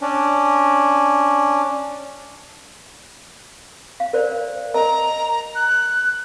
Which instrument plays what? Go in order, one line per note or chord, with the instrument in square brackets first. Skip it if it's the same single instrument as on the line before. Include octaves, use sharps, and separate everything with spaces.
[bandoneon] C#4 D4
[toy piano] F5
A#4 C5 D5
[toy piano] A#4 D#5 A5 [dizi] A#5
[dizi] F#6